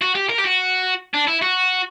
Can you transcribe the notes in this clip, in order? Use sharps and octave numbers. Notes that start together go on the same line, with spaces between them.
F#4
G4
A#4
G4
F#4
D4
E4
F#4